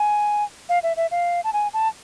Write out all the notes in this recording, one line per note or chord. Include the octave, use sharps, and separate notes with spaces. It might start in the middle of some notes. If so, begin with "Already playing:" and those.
Already playing: G#5
F5
E5
E5
F5
A5
G#5
A5